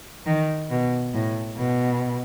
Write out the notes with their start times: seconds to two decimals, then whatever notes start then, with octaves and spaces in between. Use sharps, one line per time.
0.26 D#3
0.70 B2
1.14 A2
1.57 B2